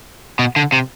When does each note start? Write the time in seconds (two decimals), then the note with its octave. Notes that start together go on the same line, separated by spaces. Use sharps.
0.39 B2
0.56 D3
0.72 C3